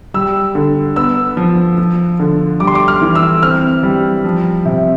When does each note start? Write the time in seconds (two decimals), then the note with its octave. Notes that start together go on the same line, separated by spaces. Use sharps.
0.14 G3 E6
0.55 D3
0.96 B3 E6
1.37 F3
1.78 F3
2.20 D3
2.60 G3 D6
2.67 C6
2.75 D6
2.88 F6
3.01 E3
3.15 E6
3.43 C4 F6
3.83 G3
4.24 F3
4.66 C3